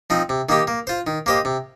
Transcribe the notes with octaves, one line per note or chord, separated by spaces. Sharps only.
F3 C4 D#4
C3
D#3 A#3 D#4 G4
A#3
F4 C5
D#3
A#3 G4 C5 D#5
C3